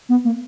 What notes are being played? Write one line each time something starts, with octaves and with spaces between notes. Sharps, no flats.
B3
A#3